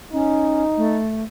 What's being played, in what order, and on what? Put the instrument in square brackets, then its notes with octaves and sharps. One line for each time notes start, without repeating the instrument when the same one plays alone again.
[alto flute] C#4 [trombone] D#4
[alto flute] A3